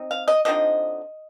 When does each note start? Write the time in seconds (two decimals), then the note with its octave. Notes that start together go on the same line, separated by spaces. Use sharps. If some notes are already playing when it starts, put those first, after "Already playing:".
Already playing: C4 D#4
0.11 F5
0.28 D#5
0.45 D3 F3 C4 D#4 D#5